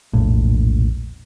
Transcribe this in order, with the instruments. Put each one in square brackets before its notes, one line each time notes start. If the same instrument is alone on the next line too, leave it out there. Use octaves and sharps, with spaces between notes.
[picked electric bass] E1 A#1 A2